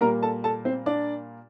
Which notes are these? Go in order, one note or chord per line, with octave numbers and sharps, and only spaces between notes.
A#2 G3 A#3 A#4 A#5
A4 A5
A4 A5
C4 C5
D4 D5